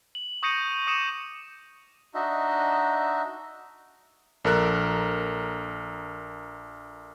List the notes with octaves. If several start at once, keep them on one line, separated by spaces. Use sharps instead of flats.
F#7
C#6 D#6 G6 A#6 C#7 D#7
D6 D#6 C#7 D#7 E7
D4 D#4 F#4 D#5 E5
A#1 A4 A#4 F#6